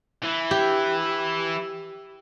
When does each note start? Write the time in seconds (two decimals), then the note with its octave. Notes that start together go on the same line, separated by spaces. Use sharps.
0.23 E3 E4
0.51 G4